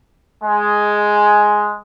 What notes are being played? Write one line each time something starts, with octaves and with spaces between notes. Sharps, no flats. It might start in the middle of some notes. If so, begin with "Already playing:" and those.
G#3